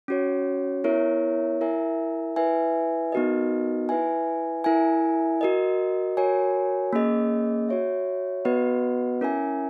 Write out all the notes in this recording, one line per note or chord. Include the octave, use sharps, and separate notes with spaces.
C#4 F#4 C#5
B3 E4 A#4 C#5 E5
E4 A#4 E5 G#5
E4 B4 E5 G#5
B3 D#4 F#4 A#4 D#5
E4 B4 E5 G#5
E4 A#4 E5 G#5
F#4 A#4 D#5
F#4 A#4 C#5 G#5
A#3 C#4 G#4 D#5
F#4 C#5 E5
B3 F#4 B4 D#5 F#5
C#4 E4 A#4 E5 G#5